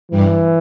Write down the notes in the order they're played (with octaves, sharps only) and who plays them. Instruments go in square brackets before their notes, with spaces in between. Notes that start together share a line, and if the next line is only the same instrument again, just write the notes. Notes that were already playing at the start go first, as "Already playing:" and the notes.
[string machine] G2 G3 [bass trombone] E3